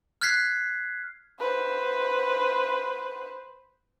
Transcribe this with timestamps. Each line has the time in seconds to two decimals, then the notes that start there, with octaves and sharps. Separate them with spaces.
0.21 F6 F#6 G#6 B6 C7
1.40 B4 C5